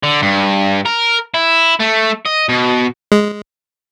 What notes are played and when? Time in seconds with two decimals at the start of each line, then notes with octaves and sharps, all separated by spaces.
0.03 D3
0.22 G2
0.86 A#4
1.34 E4
1.80 A3
2.25 D#5
2.49 B2
3.12 G#3